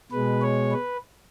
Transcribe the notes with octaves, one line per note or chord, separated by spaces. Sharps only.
B2 G#3 B4
C#5
B4